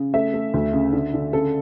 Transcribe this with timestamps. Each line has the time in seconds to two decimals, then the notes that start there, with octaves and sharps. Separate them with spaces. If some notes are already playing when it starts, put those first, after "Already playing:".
Already playing: C#3
0.14 A3 E5
0.34 A3
0.54 D2
0.73 C#3
0.93 D3
1.14 D3
1.33 C#3 A4